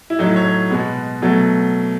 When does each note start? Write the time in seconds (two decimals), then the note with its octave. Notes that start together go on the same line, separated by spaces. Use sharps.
0.10 E4
0.19 A2 F#3 A3 D#4
0.36 C#5
0.70 B2 G#3 B3
1.22 B2 F#3 A3